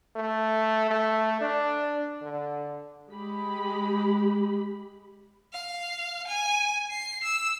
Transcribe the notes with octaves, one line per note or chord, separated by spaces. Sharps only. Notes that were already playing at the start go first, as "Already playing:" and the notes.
A3
A3
D4
D3
G#3 G4 B5
F5
G#5
C7
E6